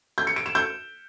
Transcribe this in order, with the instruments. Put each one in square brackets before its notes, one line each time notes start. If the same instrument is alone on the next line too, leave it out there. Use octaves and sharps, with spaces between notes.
[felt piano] G6
C#7
D7
E7
G6